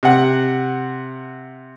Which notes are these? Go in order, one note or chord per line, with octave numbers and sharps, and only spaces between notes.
C3 F#5